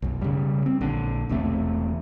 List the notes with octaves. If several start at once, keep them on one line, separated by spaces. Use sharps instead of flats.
B1 F#2
C#3 G3
C4
A#1 D3
E1 E2 C3 A3